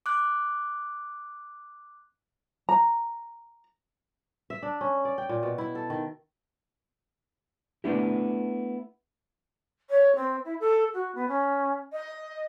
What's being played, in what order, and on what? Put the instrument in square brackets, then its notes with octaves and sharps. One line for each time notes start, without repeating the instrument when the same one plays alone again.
[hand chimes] D6 F#6
[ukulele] A#5
[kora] E5
D4
C#4
D5
G5
A#2
B2
E4
A4
D#3
[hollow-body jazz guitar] A3 B3 D4 E4 G4
[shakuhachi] C#5
C4
E4
A4
F#4
B3
C#4
D#5